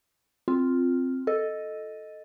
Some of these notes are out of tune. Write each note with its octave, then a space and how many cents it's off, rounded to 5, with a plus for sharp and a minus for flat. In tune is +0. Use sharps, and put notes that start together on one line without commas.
C4 +0 F4 +0
A4 +0 D#5 +0